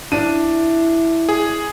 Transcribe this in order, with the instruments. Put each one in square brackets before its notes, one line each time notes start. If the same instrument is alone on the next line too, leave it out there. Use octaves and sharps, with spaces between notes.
[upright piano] D4 D#7 [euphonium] E4
[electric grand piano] G#4